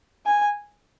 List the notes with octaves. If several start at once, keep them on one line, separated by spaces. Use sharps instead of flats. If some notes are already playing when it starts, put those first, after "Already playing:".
G#5